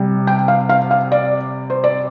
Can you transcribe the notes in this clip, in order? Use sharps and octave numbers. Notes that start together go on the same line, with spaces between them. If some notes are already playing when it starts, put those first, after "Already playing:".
Already playing: C3 G3
G5
F5
F5
F5
D5
C5
D5